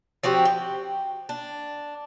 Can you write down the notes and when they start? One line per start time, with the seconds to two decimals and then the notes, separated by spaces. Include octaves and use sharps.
0.23 F3 C4 F#4 G4
0.45 G5
1.29 D4